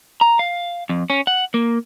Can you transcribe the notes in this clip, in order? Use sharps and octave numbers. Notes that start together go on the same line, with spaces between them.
A#5
F5
F2
C#4
F#5
A#3